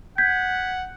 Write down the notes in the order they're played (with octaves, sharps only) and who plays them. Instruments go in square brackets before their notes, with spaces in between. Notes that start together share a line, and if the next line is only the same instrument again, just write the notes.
[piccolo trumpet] F#5 [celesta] G6 G#6 B6